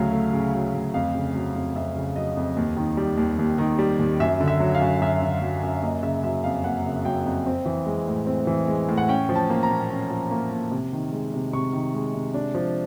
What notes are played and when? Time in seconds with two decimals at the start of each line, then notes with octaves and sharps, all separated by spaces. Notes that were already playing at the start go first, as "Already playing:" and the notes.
Already playing: D2 C#3 F#3 A3 F5
0.13 A3
0.33 C#3
0.54 F#3
0.74 D2
0.94 F2 F5
1.15 C#3
1.35 F#3
1.56 F2
1.76 F2 E5
1.96 C#3
2.16 F#3 D#5
2.37 F2
2.57 D#2
2.77 D#3
2.97 G3
3.18 D#2
3.39 D#2
3.58 D#3
3.79 G3
3.99 D#2
4.20 F#2 E5
4.40 D3
4.48 E5
4.60 F#3
4.75 F5
4.81 F#2
5.01 F#2 E5
5.22 D3
5.42 F#3
5.63 F#2
5.83 A#3 D#5
6.03 C#3 E5
6.24 F#3 E5
6.44 F2 F5
6.64 A#3 F#5
6.84 C#3
7.05 F#3 G5
7.25 F2
7.46 C4
7.66 E3
7.86 G#3
8.07 A2
8.27 C4
8.47 E3
8.68 G#3
8.89 A2
8.97 F#5
9.08 C#4 G5
9.29 F3
9.36 A5
9.50 A#3
9.63 A#5
9.70 A#2
9.90 C#4
10.10 F3
10.31 A#3
10.51 A#2
10.71 C3
10.93 D#3
11.12 G#3
11.33 C3
11.53 C3 C#6
11.73 D#3
11.95 G#3
12.14 C3
12.34 D4
12.54 F3